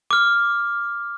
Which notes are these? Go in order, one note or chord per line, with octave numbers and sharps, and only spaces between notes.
D6 F6